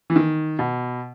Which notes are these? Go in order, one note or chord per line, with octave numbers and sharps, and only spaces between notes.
E3
D#3
B2